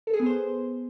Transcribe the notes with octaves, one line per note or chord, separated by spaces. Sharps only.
A4
G#4
B3
C5